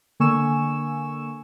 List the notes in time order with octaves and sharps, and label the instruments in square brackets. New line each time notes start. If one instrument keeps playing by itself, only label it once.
[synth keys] D3 A#3 G#5 C#6 E6 E7